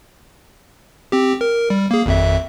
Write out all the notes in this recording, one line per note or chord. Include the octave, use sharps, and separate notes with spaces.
C4 G4
A#4
G3
A#3 G#4
G#1 F2 E5